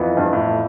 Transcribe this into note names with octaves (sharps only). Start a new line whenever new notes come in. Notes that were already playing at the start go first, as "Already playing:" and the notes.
Already playing: F2 E3 B3
G2
A2